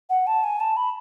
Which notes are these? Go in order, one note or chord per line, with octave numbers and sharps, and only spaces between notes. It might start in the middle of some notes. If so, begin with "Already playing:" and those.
F#5
A5
G#5
A5
B5